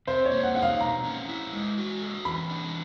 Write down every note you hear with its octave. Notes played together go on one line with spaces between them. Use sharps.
C3 C5
C#5
A#3
F#5
D#4 F#5
F5
B2 A#5
C#4
E4
G#3
F#4
A4
E3 B5
D4